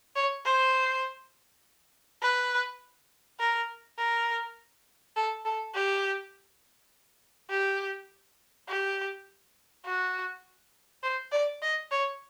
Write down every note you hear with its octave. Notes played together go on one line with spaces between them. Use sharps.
C#5
C5
B4
A#4
A#4
A4
A4
G4
G4
G4
F#4
C5
D5
D#5
C#5